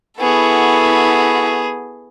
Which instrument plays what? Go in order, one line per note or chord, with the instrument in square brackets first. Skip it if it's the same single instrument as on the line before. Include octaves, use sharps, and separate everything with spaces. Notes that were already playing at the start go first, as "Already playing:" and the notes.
[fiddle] B3 G#4 [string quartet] E4 F#4 A4